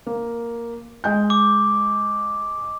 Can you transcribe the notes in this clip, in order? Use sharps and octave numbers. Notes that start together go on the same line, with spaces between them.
A#3
G#3 G6
D6